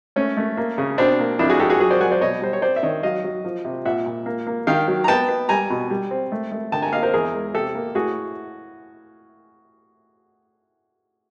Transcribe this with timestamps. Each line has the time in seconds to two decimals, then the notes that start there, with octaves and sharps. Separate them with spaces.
0.16 A3 C#4
0.37 A3
0.57 A#3
0.78 C#3
0.98 B2 C4 D4
1.19 A#3
1.39 F2 D4 E4
1.50 F#4 G#4
1.60 F2 G4 A4
1.70 F#4 G#4
1.80 F#3 F#4 G#4
1.91 C5 D5
2.01 F#3 F#5 G#5
2.11 C5 D5
2.21 B2 C#5 D#5
2.41 G3 C5
2.53 C#5
2.62 C4 C5 D5
2.76 E5
2.83 D#3 C#5 D#5
3.03 F#3 D#5 F5
3.24 F#3
3.45 F3
3.65 C3
3.85 A#2 E5 F#5
4.06 A#2
4.26 A#3
4.47 A#3
4.67 D#3 F5 G5
4.88 F#3
5.04 A#5
5.08 B3 G5 A5
5.28 B3
5.49 G3 G#5 A#5
5.70 B2
5.90 G3
6.11 C4
6.32 A3
6.52 A3
6.72 D3 G5 A5
6.82 G#5 A#5
6.92 A#3 D#5 F5
7.03 A#4 C5
7.13 E2 G#4 A#4
7.34 G#3
7.54 C3 G4 A4
7.75 A#3
7.95 A2 F#4 G#4